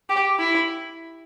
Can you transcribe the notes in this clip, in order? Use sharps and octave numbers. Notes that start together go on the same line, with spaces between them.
G4
E4